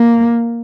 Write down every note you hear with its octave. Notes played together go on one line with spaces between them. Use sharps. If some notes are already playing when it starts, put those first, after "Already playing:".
Already playing: A#3